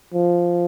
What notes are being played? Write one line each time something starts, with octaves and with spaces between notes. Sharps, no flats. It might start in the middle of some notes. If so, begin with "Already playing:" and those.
F3